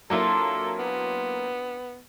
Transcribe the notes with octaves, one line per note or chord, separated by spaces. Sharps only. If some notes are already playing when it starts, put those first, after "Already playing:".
F#3 A#3 C4 D4 E4 F4 A4
B3